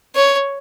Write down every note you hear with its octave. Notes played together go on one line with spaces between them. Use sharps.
C#5